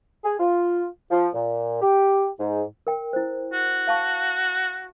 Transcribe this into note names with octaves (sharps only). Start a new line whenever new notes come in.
G#4
F4
F3
A#2
G4
G#2
A#4 G5
E4 C5
F#4
F5 A5 C#6